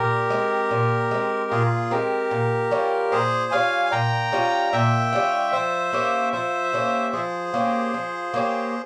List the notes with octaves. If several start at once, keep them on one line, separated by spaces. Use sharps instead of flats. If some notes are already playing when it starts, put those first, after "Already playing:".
Already playing: A#2 G4 A#4
G#3 C4
A#2
G#3 C4
A#2 F4 G#4
G#3 C4 G4 A#4
A#2
G3 C#4 F4
A#2 G#4 C5
G3 C#4 F4 F5 G#5
G#5
A#2 G5 A#5
G3 C#4 F4
A#2 E5 G5
G3 C#4 F4
F3 C5 E5
A#3 C#4 G4
F3 C5 E5
A#3 C#4 G4
F3 G#4 C5
A#3 C#4 G4
F3
A#3 C#4 G4